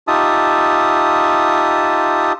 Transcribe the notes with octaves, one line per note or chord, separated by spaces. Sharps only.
D#4 F4 G4 E5 A5 D#6